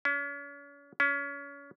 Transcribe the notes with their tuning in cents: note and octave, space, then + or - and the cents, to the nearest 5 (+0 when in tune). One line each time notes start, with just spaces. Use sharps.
C#4 +40
C#4 +30